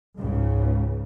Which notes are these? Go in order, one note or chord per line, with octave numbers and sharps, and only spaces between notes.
C#2 G#2 C#3